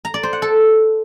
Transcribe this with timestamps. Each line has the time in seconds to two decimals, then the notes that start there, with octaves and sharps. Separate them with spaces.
0.05 A#5
0.14 D5
0.23 C5
0.33 F#5
0.42 A4